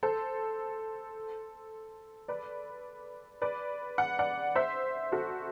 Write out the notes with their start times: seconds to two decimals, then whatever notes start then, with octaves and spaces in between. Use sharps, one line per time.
0.03 A4 C5
2.28 B4 D5
3.42 B4 D5
3.98 F#5
4.19 D5 F#5
4.56 C5 E5
5.12 F#4 A4